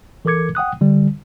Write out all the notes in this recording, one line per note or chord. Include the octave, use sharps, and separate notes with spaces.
E3 A4 A#4 D6 G#6 C#7
F#5 G5 D#6 F#6
D3 G3